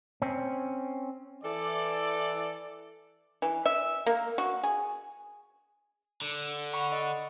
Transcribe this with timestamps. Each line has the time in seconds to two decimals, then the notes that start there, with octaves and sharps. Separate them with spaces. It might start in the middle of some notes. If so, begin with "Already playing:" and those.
0.22 C4 C#4
1.44 E3 A4 D5
3.42 E3
3.66 E5
4.06 A#3
4.38 F#4
4.63 G#4
6.22 D3
6.73 F#5 B5 C#6
6.92 D#5